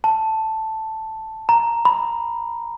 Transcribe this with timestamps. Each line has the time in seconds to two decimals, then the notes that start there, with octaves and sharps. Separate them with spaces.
0.04 A5
1.49 A#5
1.85 B5